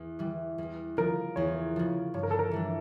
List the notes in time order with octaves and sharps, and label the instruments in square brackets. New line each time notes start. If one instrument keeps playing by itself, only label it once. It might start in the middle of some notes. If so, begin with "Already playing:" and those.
Already playing: [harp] E2
E3 G3
E2
[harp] C#3 F3 [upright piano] A#4
[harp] E2 [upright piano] C#5
[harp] C#3 F3
[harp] G2 [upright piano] C#5
[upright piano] A#4
A4
A#4
[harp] E3 G3 D4